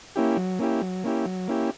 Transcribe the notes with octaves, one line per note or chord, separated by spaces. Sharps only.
A#3 C#4 E4 G4
F#3
A#3 C#4 E4 G4
F#3
A#3 C#4 E4 G4
F#3
A#3 C#4 E4 G4